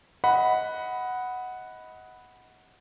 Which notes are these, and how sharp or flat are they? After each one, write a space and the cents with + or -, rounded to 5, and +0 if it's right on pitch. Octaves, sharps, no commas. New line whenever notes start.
D#5 +25 F#5 +0 B5 +0